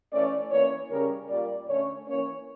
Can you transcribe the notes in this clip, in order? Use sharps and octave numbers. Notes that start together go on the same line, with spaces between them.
E3 A3 C#4 D5
E3 A#3 C#4 C#5
C#3 G3 C#4 A#4
A#2 G3 A#3 D5
D3 A3 C#4 C#5
E3 A#3 C#4 C#5